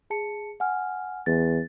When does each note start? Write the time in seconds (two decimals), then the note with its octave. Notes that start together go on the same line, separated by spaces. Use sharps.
0.10 G#4 A5 C#7
0.60 F#5 G#5 F6
1.26 E2 A6